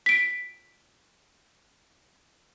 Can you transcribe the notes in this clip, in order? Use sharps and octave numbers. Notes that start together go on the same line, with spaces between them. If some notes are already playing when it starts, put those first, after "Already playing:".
B6 D7